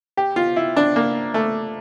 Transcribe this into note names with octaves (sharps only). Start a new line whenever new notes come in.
G4
F4
E4
D4
A#3
A3